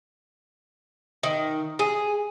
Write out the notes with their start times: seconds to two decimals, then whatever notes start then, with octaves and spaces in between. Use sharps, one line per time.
1.23 D#3
1.79 G#4